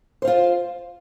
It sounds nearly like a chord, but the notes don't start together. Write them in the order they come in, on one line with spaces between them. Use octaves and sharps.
C5 F5 F4